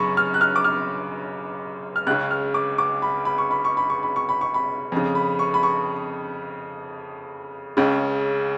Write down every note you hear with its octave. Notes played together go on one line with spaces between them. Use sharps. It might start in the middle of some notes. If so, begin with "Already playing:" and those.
Already playing: F#2 C#3 B5 C#6
F6
F#6
F6
D6
F6
F6
C#2 C#3 F#6
F6
D6
D6
B5
B5
C#6
B5
C#6
B5
C#6
B5
C#6
B5
C#6
B5
F2 C#3
B5
C#6
B5
C#6
C#2 C#3